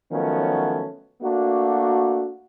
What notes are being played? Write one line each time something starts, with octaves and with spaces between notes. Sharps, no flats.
D#3 F3 F#3 A3 B3 C#4
A3 A#3 D4 F#4